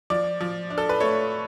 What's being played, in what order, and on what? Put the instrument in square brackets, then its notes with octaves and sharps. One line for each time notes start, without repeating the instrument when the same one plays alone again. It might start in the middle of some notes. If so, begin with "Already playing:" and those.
[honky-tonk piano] F3 D5
F3
D4
A4
B4
A3 C#5